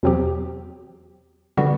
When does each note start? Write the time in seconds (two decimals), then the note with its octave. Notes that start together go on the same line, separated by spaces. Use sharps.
0.03 E2 B2 F#3 C4 G4
1.57 D3 G3 B3 F#4